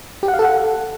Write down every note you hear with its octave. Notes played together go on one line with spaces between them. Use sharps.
G4
F#5
F5
A4
F#5